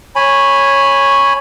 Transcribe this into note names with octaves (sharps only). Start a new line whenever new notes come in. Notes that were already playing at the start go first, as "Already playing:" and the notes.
C#5 G#5 B5